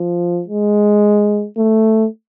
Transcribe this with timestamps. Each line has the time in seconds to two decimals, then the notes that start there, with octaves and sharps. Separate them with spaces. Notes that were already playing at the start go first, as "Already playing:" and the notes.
Already playing: F3
0.48 G#3
1.57 A3